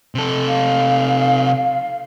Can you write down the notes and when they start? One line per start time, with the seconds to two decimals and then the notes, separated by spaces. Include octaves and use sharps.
0.15 C3 A4
0.48 F5